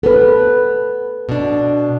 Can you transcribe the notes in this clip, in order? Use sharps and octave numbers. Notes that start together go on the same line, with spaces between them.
B3 A4 B4
B2 D4